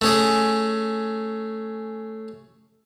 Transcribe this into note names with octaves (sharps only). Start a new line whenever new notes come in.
A3 C#4 G#4